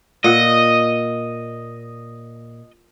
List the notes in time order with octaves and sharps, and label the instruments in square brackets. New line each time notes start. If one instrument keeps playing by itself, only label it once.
[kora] A#2 F#5 [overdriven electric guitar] D#5